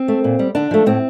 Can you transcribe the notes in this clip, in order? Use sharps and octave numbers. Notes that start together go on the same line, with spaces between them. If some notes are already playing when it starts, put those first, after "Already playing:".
Already playing: C4
A3
A#2
G3
D3 D4
F3 A3
A2 C4